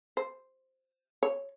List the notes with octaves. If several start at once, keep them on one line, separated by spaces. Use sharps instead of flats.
C5
C#5